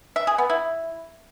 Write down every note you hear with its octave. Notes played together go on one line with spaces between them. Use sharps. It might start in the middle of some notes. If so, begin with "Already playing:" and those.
E5
G#4
B3
E4